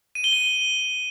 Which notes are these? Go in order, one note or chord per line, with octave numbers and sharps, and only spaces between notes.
D#7
G7
D#7